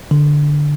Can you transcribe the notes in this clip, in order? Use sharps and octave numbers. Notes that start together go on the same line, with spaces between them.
D3